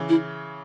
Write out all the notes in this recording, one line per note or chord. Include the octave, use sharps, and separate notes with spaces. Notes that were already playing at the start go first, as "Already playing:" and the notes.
Already playing: C#3 E3
E4